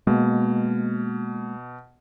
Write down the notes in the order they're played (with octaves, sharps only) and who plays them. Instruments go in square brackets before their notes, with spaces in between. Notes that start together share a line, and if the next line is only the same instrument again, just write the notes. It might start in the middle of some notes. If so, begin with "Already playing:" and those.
[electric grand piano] B2 [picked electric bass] G#3 A#3